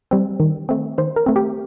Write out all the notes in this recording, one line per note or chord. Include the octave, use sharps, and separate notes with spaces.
G3 C4
D#3
A3 C4
D#3 C5
A#4
A3 C4
G4